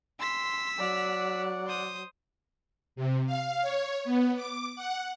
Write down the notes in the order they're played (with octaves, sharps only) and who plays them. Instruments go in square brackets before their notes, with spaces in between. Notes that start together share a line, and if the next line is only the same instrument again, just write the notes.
[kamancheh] C6 [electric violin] E6 B6
[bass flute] F#3 [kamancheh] D5 F#5
[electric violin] C5 D#6
[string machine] C3
F5
C#5
B3
D6
F#5